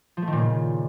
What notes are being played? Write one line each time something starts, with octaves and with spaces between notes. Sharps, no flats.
F3
A3
D#3
A#2
C#3